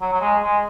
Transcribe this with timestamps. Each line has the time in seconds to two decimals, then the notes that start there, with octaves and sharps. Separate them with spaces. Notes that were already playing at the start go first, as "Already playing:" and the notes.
0.01 F#3
0.13 F#3
0.21 G#3
0.42 G#3